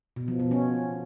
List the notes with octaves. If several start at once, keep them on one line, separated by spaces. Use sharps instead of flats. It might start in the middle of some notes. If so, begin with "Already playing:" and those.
B2
F3
B2
C#4